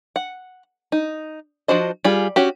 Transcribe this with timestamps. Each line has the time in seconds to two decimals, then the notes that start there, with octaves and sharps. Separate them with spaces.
0.16 F#5
0.92 D#4
1.68 F3 D4 F#4 C5 D#5
2.04 G3 F4 G#4
2.36 C#4 F#4 G4